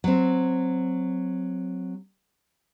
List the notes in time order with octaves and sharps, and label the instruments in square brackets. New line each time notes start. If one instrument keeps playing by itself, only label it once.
[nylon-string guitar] F#3 C4